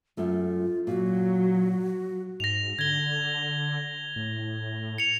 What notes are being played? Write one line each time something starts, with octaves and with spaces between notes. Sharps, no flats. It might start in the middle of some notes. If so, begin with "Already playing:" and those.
F#2 A3 F4
A#2 F#3 F#4
G#2 A#6 F7
D3 G#6 G7
A2
C#7 F7